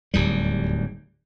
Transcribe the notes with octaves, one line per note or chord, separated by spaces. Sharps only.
D1 D#2 G3